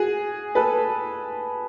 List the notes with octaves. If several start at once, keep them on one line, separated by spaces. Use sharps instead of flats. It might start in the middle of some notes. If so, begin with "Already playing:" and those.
Already playing: F#4 G#4
A4 B4